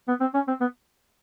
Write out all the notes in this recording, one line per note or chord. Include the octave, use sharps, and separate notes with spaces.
B3
C4
C#4
C4
B3